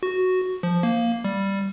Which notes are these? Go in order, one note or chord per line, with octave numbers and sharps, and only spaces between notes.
F#4
F3
A#3
G3